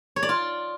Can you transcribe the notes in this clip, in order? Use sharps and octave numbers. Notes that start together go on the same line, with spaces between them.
C#5
D5
F4